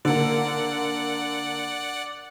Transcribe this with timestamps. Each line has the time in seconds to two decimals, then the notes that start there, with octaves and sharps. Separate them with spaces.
0.05 D3 A#3 D5 F#5